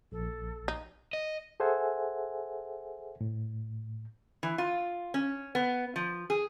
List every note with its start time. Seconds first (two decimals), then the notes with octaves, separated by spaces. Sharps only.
0.12 A#1 A4
0.68 D#4
1.13 D#5
1.60 G#4 A4 C5 E5 F#5 G#5
3.21 A2
4.43 E3
4.58 F4
5.14 C#4
5.55 B3
5.96 F3
6.30 G#4